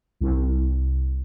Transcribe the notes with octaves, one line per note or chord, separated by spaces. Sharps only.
C2